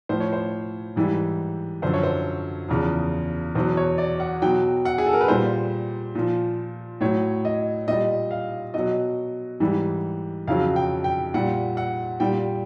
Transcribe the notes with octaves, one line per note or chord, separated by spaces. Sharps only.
A2 F3 C5
C#5
C5
G#2 E3 G3
F#2 D3 F3 C5
C#5
C5
E2 C#3 F3
E2 B2 F#3 C5
C#5
D5
F#5
B2 F#3 G5
F#5
G#4
A4
A#4
B4
A#2 G3 C5
A#2 F3
A2 F#3 C#5
D#5
A#2 G3 D#5
F5
B2 F#3 D#5
G#2 E3 G3
F2 C#3 F#3 F5
G5
G5
A#2 G3 F#5
F#5
A#2 G3 G5